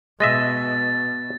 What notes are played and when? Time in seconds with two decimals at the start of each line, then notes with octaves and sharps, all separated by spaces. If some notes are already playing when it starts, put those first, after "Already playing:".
0.20 B2 G#3 D#5 E5 A6